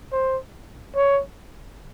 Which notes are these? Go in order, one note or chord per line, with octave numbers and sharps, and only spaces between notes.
C5
C#5